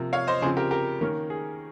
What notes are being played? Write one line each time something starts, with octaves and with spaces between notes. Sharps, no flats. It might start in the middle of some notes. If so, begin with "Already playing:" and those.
Already playing: C3 F3 A#3
C#5 F5
C5 D#5
C#3 F3 C4 G#4 C5
G4 A#4
G4 A#4
D#3 A#3 C#4
G#4